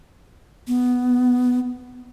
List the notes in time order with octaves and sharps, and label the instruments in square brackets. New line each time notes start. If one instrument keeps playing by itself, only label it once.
[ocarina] B3